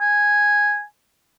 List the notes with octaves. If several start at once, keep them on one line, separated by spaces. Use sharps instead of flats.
G#5